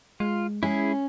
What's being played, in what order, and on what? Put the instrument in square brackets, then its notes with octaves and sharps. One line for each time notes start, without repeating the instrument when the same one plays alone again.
[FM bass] G#3 [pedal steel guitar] F4
[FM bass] G#3 [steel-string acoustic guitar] C#4 [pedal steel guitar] E4 G#4